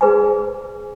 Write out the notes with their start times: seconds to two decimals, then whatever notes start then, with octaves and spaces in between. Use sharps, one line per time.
0.01 G#4 B4 C5 D5 G#5